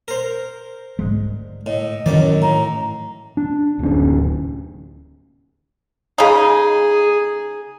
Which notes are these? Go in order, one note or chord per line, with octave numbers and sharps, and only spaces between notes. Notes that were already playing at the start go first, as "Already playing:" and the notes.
A#4 C5
G#2 D3 G#3
A2 D#5
F#2 A2 D#3 E3 D5
A2 A#5
D4
D1 C#4
C#3 D#4 G#4